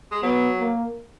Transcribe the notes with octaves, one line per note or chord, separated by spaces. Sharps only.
G#3
F#3 B3
A#3